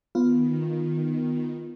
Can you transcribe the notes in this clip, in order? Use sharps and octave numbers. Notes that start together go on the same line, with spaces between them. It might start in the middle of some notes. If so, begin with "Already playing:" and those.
D#3 B3 F4